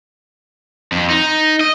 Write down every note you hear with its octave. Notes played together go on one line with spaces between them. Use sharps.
F2
D#4
D#5